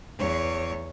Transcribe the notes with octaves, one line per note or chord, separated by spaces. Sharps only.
E2 C#5